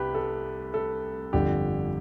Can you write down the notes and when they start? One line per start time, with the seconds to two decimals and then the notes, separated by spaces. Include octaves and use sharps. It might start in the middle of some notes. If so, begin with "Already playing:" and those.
Already playing: C2 G4 B4
0.15 A4
0.74 A4
1.33 G1 F2 D3 G4